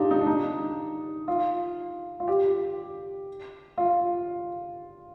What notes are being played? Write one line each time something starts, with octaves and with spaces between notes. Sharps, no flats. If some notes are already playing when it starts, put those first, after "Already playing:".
Already playing: D4 D#4 F4 G4
D#4
D4
D#4
F4
F4
G4
F4